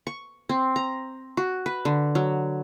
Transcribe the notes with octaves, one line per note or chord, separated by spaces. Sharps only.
C#6
C4
A#5
F#4
B4
D3
F#3